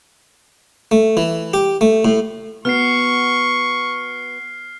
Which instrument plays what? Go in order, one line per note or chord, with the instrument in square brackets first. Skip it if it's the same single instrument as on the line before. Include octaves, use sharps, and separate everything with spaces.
[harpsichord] A3
E3
G4
A3
A2
[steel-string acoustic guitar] B3 F#4 [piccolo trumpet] C#6 [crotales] F6 C7